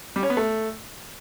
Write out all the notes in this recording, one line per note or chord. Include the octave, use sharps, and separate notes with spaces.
G3
C#4
B3
A3